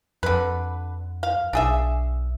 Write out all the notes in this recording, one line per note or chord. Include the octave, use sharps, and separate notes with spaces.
F2 D3 B4
F5
B1 D4 G#4 E5